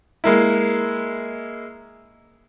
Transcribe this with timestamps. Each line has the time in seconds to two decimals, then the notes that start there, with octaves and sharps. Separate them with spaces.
0.24 G#3 A#3 E4